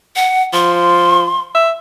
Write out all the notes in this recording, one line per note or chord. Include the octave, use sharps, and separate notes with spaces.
F#5
F3 C6
E5